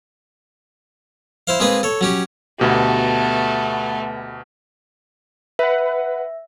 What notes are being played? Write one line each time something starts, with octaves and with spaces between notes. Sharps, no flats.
E4 C5 F5
G#3 A#3 C4 D#4 G#4 B4
A4 C#5
F#3 C#4 G4
D2 B2 A3 B3 G4
B4 E5 F#5